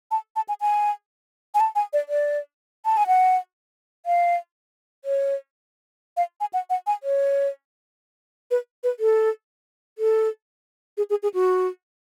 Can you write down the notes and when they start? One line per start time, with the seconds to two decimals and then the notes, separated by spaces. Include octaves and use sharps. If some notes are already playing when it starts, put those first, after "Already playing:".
0.11 A5
0.36 A5
0.49 G#5
0.61 G#5
1.55 G#5
1.60 A5
1.75 G#5
1.93 D5
2.09 D5
2.85 A5
2.97 G#5
3.07 F#5
4.06 F5
5.05 C#5
6.17 F5
6.41 G#5
6.53 F#5
6.70 F#5
6.87 G#5
7.03 C#5
8.51 B4
8.84 B4
9.00 A4
9.98 A4
10.97 G#4
11.10 G#4
11.23 G#4
11.34 F#4